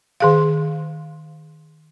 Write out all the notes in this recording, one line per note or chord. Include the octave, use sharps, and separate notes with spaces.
D#3 G#4 F5